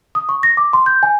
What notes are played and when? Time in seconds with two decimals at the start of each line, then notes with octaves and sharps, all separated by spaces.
0.15 D#6
0.29 C#6
0.43 A#6
0.57 D6
0.73 C6
0.86 G6
1.03 G#5